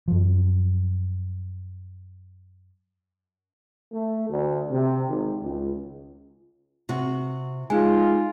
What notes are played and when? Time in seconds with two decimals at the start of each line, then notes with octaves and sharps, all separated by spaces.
0.08 F#2 F3
3.91 A3
4.28 D2
4.70 C3
5.07 G#1
5.42 C#2
6.89 C3 F#4
7.70 G#3 D#4 F4 G#5